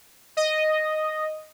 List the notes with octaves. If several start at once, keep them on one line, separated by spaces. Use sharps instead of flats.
D#5